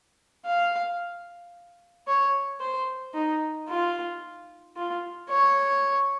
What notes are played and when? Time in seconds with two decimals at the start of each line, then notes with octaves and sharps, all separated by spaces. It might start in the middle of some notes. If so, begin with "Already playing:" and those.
0.46 F5
2.08 C#5
2.60 C5
3.14 D#4
3.69 F4
4.76 F4
5.30 C#5